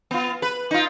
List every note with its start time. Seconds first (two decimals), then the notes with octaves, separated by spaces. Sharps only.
0.11 B3 F4
0.42 B4
0.71 D#4 F4